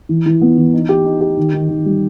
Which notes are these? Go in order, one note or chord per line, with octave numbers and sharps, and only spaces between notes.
E3
E3
B3
E3
D#4
G4
D#4
G4
D#3
D#3
D#3
G3